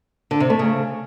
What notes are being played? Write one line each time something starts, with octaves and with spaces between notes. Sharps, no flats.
D3
C3
A3
C#3